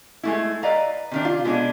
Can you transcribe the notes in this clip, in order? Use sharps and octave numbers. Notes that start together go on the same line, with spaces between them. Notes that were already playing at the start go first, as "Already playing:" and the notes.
G#3 A3 E4
B4 D5 D#5 F5 A#5
C3 D#3 D4
F4
B2 G#3 B3 D4